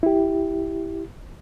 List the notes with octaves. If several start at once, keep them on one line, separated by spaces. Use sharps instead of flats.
E4 G4